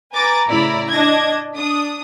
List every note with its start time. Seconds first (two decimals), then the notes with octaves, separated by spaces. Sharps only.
0.12 B4 G#5 A#5 D6 A6
0.48 A2 C#3 E4 D5 A#5 B5
0.90 D4 D#5 G#6 A#6
1.55 D4 D#6